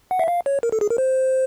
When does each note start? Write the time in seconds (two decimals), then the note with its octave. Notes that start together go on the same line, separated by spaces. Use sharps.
0.11 F#5
0.19 E5
0.28 F5
0.46 C#5
0.63 A#4
0.72 A4
0.81 G#4
0.90 A#4
0.98 C5